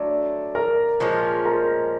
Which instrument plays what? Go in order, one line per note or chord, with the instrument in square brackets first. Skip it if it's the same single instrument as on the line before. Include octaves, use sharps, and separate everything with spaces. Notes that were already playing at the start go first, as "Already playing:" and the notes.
Already playing: [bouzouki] D3 F#3 A3 [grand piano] D5
[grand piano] A#4 A#5
[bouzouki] A#2 F3 G#3 C#4
[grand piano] A#4 A#5